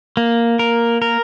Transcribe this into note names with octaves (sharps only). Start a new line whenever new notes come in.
A#3
A#4
A#4